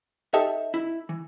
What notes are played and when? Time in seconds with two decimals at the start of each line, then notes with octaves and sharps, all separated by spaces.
0.34 D#4 G4 A4 E5
0.74 E4
1.09 E3